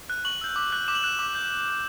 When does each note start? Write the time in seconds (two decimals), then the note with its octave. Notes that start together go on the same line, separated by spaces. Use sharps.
0.10 F#6
0.25 C#6 F#7
0.41 E6 G6
0.56 D6
0.73 F#6
0.88 D6 E7
0.95 F#7
1.03 F#6 E7
1.19 D6
1.35 G6